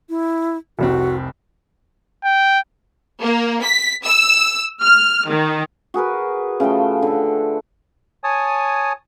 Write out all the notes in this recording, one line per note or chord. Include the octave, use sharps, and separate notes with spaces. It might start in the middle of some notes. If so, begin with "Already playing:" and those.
E4
F1 C2 C4 F#4
G5
A#3
B6
E6
F6
D#3
F#4 G#4 A#4 B4
C#3 F3 A3 G5
D3 A4
C#5 G#5 A5 D#6